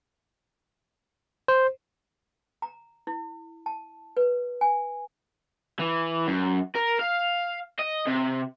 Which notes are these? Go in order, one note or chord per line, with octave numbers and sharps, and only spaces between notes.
C5
A#5
E4
A5
B4
G#5
E3
F#2
A#4
F5
D#5
C3